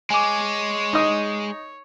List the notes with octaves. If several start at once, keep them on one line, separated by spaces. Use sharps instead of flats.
G#3 C#5 G#5 D6
D#4 D#5